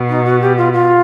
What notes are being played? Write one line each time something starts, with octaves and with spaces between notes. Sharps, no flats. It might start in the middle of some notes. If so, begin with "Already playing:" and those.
Already playing: B2
D#4
F#4
G4
F4
F4